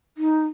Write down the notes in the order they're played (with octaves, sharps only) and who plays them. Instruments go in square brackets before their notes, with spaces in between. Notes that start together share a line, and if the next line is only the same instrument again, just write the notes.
[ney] D#4